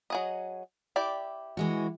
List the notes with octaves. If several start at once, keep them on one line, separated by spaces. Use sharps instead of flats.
F#3 G#4 D#5
E4 G4 D5
E3 G#3 F#4